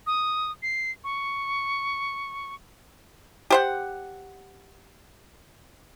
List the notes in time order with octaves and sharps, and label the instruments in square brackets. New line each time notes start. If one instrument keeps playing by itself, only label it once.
[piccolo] D#6
C7
C#6
[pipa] G4 C5 F#5